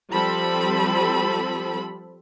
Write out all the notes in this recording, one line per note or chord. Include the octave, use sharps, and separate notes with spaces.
F3 G3 C4 A4 B5